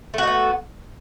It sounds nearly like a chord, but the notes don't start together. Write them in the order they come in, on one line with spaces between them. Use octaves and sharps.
A3 F#4 D#4 B3